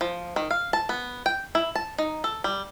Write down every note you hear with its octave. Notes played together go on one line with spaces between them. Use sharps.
F3
D#3
F5
A5
B3
G5
E4
A5
D#4
A4
G3